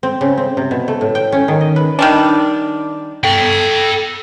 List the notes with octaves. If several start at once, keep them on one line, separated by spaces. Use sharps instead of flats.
C4
C#3
C4
C3
B2
A3
A2
G5
C#4
D#3
D#5
B4
D#3 G3 D4
A4 G5